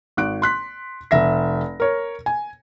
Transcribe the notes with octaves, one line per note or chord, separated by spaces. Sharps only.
G#1 F#6 D7
C6 F#6 B6
F1 E5 A#6
A#4 C#5
G#5